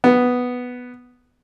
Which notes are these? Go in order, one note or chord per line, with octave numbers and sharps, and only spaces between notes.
B3